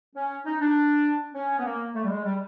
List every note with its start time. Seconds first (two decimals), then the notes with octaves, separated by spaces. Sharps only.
0.16 C#4
0.45 D#4
0.60 D4
1.34 C#4
1.58 B3
1.65 A#3
1.95 A3
2.04 G3
2.09 G#3
2.24 G3